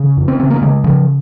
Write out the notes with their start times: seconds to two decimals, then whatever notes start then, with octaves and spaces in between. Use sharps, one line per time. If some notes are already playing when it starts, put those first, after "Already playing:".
Already playing: C#3
0.17 F2
0.28 C4
0.40 C#3 C4
0.50 A#3
0.62 C#3 G#3
0.84 C#3 F3